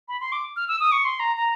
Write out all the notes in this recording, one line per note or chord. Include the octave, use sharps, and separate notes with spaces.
B5
C6
D6
F6
E6
D#6
C#6
C6
A#5
A#5